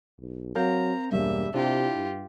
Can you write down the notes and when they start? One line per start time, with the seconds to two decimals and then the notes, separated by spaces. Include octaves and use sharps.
0.19 B1
0.55 F#3 C4 A#4 F5 A#5 G6
1.12 E1 G2 G3 A#3 E5
1.54 C3 D4 E4 F4 G4
1.96 G2